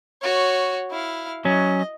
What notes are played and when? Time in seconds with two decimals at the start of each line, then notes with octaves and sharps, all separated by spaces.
0.22 F#4 C#5
0.90 E4 F5
1.45 F#3 C#4 D#5